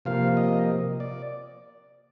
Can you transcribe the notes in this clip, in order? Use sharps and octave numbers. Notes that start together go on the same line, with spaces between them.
C3 F3 A#3 F5
D#5
D5